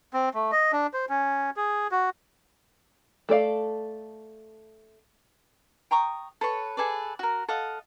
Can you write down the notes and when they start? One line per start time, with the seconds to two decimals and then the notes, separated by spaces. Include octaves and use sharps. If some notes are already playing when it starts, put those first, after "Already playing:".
0.13 C4
0.34 A3
0.52 D#5
0.72 D4
0.94 C5
1.09 C#4
1.56 G#4
1.91 F#4
3.29 A3 A4 D5 F5
5.91 G5 A#5 C#6 D#6
6.41 A4 B4 C#5
6.77 G#4 A4 B4 D5
7.19 F#4 A#4
7.48 A4 D#5 F5 F#5